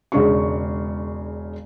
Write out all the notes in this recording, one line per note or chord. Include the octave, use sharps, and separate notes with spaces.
E1 C#3 G#3 D4 G#4 C#6